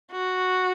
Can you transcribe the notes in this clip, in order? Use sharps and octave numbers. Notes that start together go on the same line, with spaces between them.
F#4